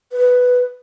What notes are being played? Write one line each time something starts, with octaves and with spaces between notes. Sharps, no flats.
B4